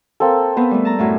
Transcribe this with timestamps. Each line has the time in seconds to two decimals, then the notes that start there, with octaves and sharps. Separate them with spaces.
0.20 A#3 C4 A4
0.57 B3 C4 B4
0.71 G3 A3
0.85 A5 A#5
0.99 F#2 A2 A3